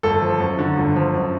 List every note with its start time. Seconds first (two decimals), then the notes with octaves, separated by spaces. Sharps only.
0.03 G1 A4
0.22 F3
0.40 F#2
0.59 D3
0.77 G1
0.96 F3
1.14 F#2